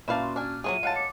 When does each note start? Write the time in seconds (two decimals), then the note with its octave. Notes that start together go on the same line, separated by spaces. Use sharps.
0.08 A#2 C#4 E4 F#4 B4 F5 A5
0.21 C6
0.36 D4 G#5 F6
0.64 F#3 C4 F4 G#4 E5 D#7
0.83 G#3 C#5 F5 F#5 A5
0.95 D6 C#7